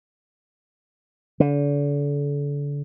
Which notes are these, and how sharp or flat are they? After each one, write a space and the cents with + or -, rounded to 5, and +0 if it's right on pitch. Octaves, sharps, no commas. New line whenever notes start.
D3 -35